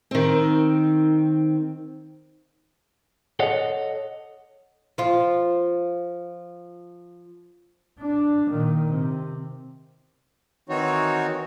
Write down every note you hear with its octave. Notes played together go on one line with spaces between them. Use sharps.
D#3 C4
A4 C#5 D#5 F#5
F3 F4
D4
A#2 D#3
C3
D#3 E3 C4 D#4 F#4 C#5